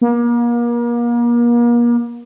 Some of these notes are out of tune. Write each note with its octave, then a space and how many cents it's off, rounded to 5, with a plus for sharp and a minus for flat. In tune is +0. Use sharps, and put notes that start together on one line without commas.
A#3 +35